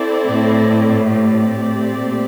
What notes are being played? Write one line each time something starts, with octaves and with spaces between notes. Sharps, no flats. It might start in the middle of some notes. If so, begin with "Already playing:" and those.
Already playing: C4 E4 A4 D5
A2
A3 C4 G4 D5
A#2